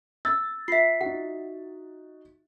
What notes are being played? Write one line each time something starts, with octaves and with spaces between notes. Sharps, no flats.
E6 A6
F4 E5 B6 C7
D#4 F#4 F#5